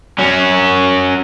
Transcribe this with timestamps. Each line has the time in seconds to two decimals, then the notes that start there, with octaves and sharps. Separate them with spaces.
0.19 F#3 C#4